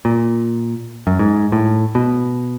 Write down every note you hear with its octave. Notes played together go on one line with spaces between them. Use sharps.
A#2
F#2
G#2
A2
B2